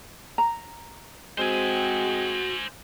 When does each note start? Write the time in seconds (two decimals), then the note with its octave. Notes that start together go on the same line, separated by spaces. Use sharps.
0.38 A#5
1.38 G#3 C4 F#4 C5 G#5